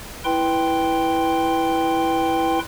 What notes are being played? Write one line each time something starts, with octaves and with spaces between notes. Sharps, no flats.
E4 B4 G5 C6